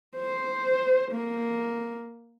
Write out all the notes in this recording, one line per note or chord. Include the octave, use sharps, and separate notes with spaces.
C5
A#3